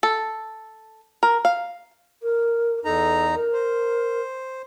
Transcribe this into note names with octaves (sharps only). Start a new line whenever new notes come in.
A4
A#4
F5
A#4
E2 D#4 A4 A#5
A#4
C5